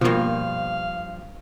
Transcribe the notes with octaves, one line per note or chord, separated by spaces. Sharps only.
G2 B2 F3 A#3 F5